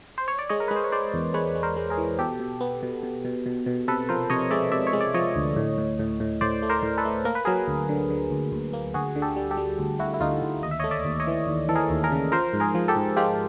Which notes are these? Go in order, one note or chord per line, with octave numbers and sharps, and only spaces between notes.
C5
C#5
D5
G#3 C#5 D#5
A#4
G#3 B4
C5
C#5
G#3 C5 D5
E2
G#3 B4 C#5
G#3
A#4 C5
G#3
G#4 A#4
E3
B2 G4 A4
B2
B3
B2
B2
B2
B2
B2
C3 A4 B4
F3 A#4 C5
C3 C#5 D#5
G#3 D5 E5
C3 D5 E5
C#5
G#3
D5
F3 C#5 D#5
D2
A2
A2
A2
A2
A2 C5 D5
A3
A#4 C5
A2
A4 B4
A3
A#3 A#4
B4
F#3 G#4 A#4
D2
D3
D3
D2
D2
A#3
D2 F#4 G#4
D3
G4 A4
G3
G4 A4
G3
D2
D2 E4 F#4
E4
D2 D#4 F4
D2
D#2 D#5
E5
A3 C#5 D#5
D5 E5
D#2
C#5 D#5
E3
D#2
E3 A4
G#4 A#4
D#2
G#4 A#4
C#3
F3 A#4 C5
G#2
G#4 A#4
F3
G4 A4
G#2
G#3 F4 G4